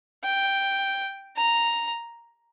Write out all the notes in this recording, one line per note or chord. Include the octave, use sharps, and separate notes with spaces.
G5
A#5